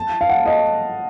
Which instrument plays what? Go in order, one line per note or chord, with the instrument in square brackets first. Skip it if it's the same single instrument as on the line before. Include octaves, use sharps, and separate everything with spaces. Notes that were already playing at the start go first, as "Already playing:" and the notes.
Already playing: [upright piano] A5
F5
F#5
D#5